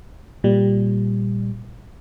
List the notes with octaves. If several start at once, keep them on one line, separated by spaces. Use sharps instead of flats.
A#2 G3